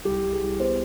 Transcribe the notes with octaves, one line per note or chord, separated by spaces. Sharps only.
C2 G4
C2
G#4
C2
B3 C5